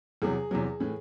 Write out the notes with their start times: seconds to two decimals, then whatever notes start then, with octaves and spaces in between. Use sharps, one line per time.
0.22 E2 C3 F#3 G#4
0.51 E2 C3 F#3
0.80 A2 E3